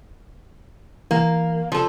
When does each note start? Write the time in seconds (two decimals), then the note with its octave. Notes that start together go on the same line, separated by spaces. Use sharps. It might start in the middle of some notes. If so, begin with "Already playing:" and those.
1.11 E3 A#3
1.72 F3 A4